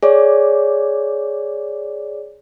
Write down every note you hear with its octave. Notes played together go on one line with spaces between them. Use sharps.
G#4 C#5 D5